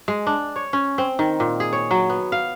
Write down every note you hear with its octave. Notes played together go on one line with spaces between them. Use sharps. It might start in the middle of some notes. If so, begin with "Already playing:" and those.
G#3
D4
C#5
C#4
C4
D#3
A#2
G#4
C#5
F#3
B3
F5